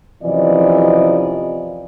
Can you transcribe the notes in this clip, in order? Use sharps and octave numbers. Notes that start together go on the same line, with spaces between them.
F#2 C3 E3 F3 D5 D#5